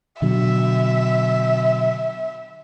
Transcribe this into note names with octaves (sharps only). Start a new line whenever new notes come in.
B2 D3 F#3 E5